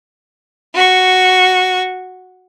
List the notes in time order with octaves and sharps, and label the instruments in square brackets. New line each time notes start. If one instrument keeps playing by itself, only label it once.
[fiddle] F#4 C#6